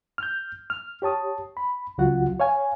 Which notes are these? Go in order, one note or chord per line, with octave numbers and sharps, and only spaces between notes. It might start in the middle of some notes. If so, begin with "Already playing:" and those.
F6 G6
F6
G4 C#5 A5 D#6
B5
C#2 C#3 F#3 F4 F#4 F#5
C#5 F5 G#5